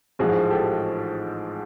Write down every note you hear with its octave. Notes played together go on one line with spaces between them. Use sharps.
A1 G#2 F3 F#4 G#4
G4 A4